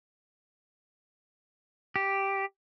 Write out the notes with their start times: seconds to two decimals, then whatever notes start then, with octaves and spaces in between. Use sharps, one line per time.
1.96 G4